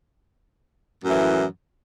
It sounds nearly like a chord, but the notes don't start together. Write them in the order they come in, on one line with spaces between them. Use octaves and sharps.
F#2 A2 E3